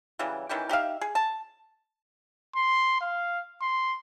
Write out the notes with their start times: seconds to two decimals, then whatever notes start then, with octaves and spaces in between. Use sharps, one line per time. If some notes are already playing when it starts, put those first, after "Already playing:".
0.19 C#3 E3 F#3 G3
0.49 D#3 E3 C#4 G4
0.69 D#4 G4 E5 F5
1.01 G#4
1.15 A5
2.56 C6
3.01 F5
3.61 C6